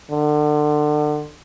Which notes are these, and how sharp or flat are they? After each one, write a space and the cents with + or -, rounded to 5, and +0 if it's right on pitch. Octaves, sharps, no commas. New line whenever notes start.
D3 +30